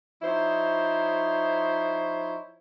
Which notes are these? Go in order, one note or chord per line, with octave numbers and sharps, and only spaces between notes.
F3 D#4 E4 C5 C#5